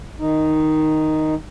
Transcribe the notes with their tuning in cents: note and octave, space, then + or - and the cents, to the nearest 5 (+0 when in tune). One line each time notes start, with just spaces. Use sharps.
D#3 +0 D#4 +0